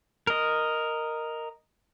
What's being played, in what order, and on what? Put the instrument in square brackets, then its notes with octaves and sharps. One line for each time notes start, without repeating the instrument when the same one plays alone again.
[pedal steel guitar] A#4 D#5